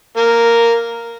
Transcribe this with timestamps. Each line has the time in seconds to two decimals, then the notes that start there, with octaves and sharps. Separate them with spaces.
0.17 A#3 A#4